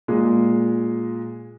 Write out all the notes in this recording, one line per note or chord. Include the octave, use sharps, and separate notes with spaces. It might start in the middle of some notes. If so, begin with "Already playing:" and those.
A#2 G#3